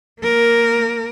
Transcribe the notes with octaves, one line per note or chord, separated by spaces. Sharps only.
A#3 A#4